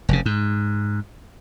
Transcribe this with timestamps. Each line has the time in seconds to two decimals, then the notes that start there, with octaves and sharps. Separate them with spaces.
0.09 F1 C#3
0.26 G#2